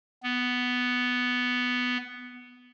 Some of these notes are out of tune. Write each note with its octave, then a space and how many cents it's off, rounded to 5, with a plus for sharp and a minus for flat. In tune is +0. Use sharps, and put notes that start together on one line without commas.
B3 +5